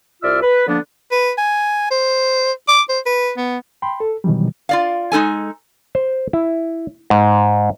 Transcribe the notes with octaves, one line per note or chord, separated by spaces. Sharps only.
C2 F4 D5 E5 E6 F6
B4
D3 F3 A#3 B3 D4
B4
G#5
C5
D6
C5
B4
B3
G5 B5 C6
A4
B2 D#3 E3 F#3 G3
F4 D5 F5
G#3 D#4 A4 G#5
C5
E4
G#2